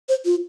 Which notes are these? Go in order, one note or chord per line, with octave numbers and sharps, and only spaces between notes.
C5
F4